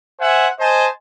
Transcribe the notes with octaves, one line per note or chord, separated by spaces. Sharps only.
C5 E5 F#5 G#5
C5 D#5 G#5 A5